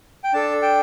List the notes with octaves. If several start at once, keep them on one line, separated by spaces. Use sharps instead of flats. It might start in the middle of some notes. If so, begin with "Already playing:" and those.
G5
D4 A4 A5
G5